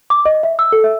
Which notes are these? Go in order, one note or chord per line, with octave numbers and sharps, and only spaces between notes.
D6
D#5
E5
E6
A4
E5